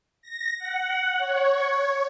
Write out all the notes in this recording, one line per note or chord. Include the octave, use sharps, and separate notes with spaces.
A#6
F#5
C#5